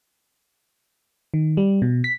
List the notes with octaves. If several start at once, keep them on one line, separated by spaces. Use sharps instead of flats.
D#3
G3
B2
B6